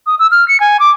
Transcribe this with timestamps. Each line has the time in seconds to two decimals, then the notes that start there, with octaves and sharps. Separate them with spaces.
0.07 D#6
0.19 E6
0.31 F6
0.48 C#7
0.60 G#5
0.80 D6